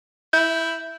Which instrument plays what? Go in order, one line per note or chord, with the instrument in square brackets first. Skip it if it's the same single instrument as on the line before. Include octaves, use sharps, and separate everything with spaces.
[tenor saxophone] E4 [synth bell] G6